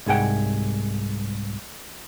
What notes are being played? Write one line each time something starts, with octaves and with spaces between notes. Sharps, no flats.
C2 G#2 G#4 F#5 G5